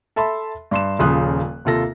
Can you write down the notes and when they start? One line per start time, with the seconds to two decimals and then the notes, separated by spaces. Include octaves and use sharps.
0.16 A4 E5 A5 B5 C6
0.71 G2 C6 E7
0.99 D#1 C#3 F3 C6 D#6 F#6
1.65 D#2 C3 F4 A4 A#6